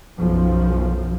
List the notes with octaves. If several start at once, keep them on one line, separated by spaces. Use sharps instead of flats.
B1 F#2 F3